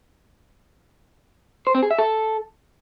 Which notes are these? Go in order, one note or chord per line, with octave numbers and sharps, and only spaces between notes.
C5
C4
G#4
E5
A4